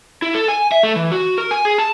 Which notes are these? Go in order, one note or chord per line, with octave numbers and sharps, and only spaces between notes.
E4
A4
G#5
E5
A3
E3
F#4
A#4
G#5
G#4
A5